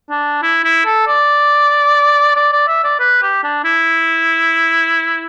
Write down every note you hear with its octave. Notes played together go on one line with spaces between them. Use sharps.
D4
E4
E4
A4
D5
D5
D5
E5
D5
B4
G4
D4
E4